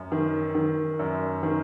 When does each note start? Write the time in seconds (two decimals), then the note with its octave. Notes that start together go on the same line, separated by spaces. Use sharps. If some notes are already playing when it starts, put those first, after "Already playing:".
Already playing: F#2
0.12 D#3
0.55 D#3
0.99 F#2
1.43 D#3